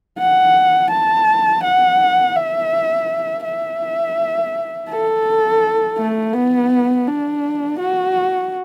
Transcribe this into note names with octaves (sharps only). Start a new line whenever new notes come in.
F#5
A5
F#5
E5
E5
A4
A3
B3
D4
F#4